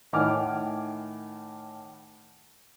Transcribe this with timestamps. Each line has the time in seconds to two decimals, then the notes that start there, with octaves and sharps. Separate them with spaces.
0.13 A2 D#3 F#5 G#5 D6 F6